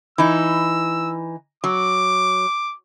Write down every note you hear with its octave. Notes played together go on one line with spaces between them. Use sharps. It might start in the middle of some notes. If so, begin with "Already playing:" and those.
E3 D#4 E6
F#3 D6